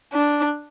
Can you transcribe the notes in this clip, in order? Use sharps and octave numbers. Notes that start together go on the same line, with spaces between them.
D4